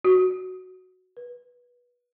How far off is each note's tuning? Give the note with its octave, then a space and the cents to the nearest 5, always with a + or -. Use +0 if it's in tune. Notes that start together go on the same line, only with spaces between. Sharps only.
F#4 +0
B4 -20